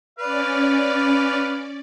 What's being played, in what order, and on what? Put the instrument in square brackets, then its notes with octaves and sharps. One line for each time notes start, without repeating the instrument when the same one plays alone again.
[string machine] C#4 D5 [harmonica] B4 F5